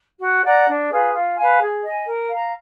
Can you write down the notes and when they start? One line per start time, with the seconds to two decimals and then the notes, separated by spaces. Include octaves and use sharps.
0.20 F#4
0.43 D5 F#5 A#5
0.66 D4
0.89 F4 G#4 B4
1.13 F4
1.36 B4 F5 G#5
1.59 G#4
1.82 D#5 G#5
2.06 A#4
2.29 F5 A#5